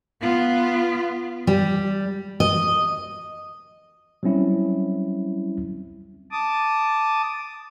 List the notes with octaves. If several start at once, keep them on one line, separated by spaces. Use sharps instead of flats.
B3 F4
G3
D#5
F#3 G3 C4 C#4 E4
A5 D6 D#6